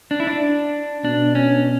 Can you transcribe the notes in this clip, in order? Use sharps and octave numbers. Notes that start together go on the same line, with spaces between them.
D4
E4
D4
B2 D4
C#4